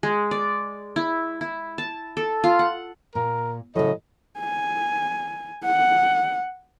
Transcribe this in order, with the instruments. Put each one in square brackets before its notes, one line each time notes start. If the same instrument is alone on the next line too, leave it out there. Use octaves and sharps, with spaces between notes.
[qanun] G#3
D5
E4
E4
A5
A4
F4
F#5
[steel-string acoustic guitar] A#2 [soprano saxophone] A#4
[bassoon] A2 [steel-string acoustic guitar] C#3 F#3 [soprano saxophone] D#5
[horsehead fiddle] G#5
F#5